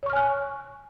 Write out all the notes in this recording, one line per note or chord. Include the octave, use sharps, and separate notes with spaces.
C#5 G#5 C#6 F6 F#6